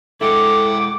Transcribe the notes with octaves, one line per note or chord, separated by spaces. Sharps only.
G#3 E4 A4 F#5 G5 D6